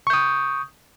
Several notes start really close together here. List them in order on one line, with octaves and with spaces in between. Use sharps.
C#6 G6 D#6